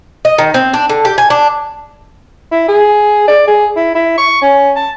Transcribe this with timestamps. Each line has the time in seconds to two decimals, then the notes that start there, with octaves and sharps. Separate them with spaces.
0.25 D#5
0.38 D#3
0.54 C4
0.74 D4
0.89 D3
1.05 G4
1.18 G#5
1.30 D4
2.51 E4
2.68 G#4
3.28 D5
3.47 G#4
3.76 E4
3.95 E4
4.18 C#6
4.42 C#4
4.76 A5